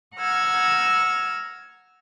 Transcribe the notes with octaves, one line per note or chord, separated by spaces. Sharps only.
F#5 A#5 E6 F6 G#6